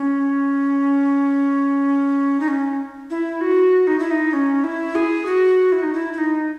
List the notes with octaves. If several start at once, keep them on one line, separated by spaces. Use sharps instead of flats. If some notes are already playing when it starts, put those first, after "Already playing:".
Already playing: C#4
D#4
C#4
E4
F#4
D#4
E4
D#4
C#4
E4
G#4
F#4
E4
D#4
E4
E4
D#4